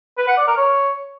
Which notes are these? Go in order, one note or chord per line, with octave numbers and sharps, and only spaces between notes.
B4
F#5
D5
A#4
C#5